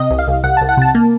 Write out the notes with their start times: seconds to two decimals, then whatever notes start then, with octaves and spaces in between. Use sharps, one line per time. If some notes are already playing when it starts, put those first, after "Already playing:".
Already playing: C3 D#5
0.11 C2
0.19 F5
0.28 C2
0.44 C2 F#5
0.57 C2 A5
0.69 F#5
0.77 C3 A5
0.95 A#3